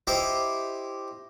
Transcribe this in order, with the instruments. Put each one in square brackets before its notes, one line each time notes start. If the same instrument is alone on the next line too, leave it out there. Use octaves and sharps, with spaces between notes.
[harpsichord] E4 G4 C5 D#5 E5